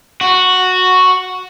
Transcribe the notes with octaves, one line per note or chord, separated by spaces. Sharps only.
F#4